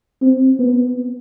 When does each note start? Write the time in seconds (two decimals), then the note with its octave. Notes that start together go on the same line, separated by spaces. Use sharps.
0.22 C4
0.60 B3